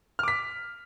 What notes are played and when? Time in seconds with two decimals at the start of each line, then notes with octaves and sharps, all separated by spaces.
0.19 F6
0.23 D6
0.28 B6